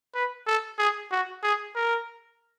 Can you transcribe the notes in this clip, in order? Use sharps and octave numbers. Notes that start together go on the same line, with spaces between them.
B4
A4
G#4
F#4
G#4
A#4